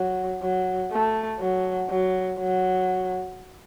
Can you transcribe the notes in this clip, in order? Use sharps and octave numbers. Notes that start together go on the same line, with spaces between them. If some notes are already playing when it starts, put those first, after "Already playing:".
Already playing: F#3
F#3
A3
F#3
F#3
F#3